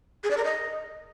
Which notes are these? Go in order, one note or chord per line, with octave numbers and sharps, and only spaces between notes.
G#4
D5
A#4
D#5